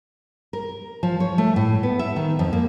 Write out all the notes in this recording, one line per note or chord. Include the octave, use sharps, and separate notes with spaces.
A#4
F3
C#5
A3
A2
B3
E5
D#3
F2
A#3